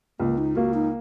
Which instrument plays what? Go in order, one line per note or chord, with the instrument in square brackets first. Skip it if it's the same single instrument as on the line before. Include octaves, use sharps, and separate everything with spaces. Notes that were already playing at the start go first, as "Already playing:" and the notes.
[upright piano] C#2 [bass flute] A#3
[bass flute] D#4
[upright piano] A#3 [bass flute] F#4
[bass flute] D#4